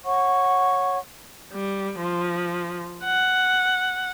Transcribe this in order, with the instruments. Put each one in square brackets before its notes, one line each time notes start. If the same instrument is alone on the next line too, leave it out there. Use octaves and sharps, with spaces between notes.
[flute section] C#5 F#5 C#6
[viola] G3
F3
F#5